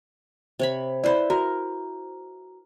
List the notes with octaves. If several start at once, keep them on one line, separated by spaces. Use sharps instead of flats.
C3 C#5 B5
E4 B4 C5 D5 B5
F#4 A#4 A#5